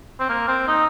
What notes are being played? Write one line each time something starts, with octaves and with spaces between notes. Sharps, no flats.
C4
A#3
C4
D#4